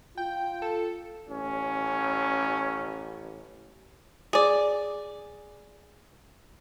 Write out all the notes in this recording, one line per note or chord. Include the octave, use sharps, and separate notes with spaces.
F4 G5
A4
A1 C#4
G#4 D5